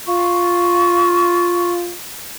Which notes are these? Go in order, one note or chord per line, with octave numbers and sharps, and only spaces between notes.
F4 C#6